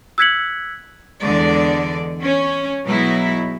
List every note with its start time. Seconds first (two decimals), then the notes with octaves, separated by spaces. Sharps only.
0.18 E6 F#6 G#6 B6 C#7 F#7
1.22 E2 D3 G#3 D5
2.22 C#4
2.86 B2 F#3 G#3 D#4 E4